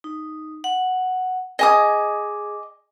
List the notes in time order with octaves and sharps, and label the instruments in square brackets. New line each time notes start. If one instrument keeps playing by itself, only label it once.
[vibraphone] D#4
F#5
[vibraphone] G#4 D6 [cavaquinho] D#5 G#5 D#6